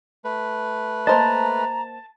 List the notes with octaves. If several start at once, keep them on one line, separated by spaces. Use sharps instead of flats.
A3 B4
A#3 C5 D#5 A5 A#5